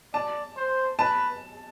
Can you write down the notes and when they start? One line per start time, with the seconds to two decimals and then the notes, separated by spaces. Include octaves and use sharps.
0.14 D5 A5
0.57 C5
0.99 B4 A5